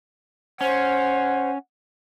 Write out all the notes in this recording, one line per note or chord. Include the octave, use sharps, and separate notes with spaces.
C#4 C5 F#5